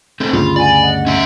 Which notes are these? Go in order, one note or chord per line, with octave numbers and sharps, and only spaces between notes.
A3 C4
D2 G2 C#3 F4 B5
D5 F#5 G#5 B5
D#5 F#5
C#4 E5